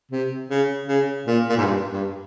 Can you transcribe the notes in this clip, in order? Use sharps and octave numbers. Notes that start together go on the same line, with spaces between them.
C3
C#3
C#3
A#2
A#2
G#2
G2
G2